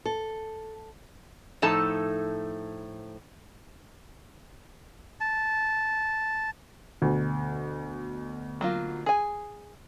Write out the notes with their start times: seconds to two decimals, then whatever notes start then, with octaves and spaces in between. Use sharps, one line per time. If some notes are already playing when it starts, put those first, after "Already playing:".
0.06 A4
1.62 A2 F3 D#4 A4 A5
5.21 A5
7.01 D2 B2
8.61 F#3 A#3 F4
9.06 G#4 G#5